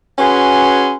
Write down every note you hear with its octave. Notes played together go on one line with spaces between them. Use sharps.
C#4 F#4 G#4 B4 G#5 C6